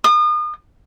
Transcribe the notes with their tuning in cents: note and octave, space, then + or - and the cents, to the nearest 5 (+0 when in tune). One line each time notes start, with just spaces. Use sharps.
D#6 -35